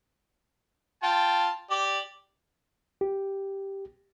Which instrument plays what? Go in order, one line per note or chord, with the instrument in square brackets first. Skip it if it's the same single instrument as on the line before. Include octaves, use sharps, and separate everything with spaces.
[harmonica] F4 G5 A5
G4 D5
[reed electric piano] G4